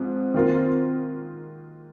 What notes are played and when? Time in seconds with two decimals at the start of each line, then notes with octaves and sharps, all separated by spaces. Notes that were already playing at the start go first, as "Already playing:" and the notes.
Already playing: G#2 F3 C4
0.34 D#3 A#3 F4 A#4